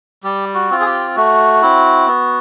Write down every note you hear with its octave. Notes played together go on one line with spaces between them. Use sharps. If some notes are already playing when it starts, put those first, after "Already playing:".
G3 G4
F#4
C4 F4
G#4
G4
A3 F#4
C4 E4
B3